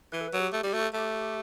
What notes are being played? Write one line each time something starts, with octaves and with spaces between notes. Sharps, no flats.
E3 B4
A4
B4
F#3
G4
A3
G3 G4
A3 F#4
G4
A3 G4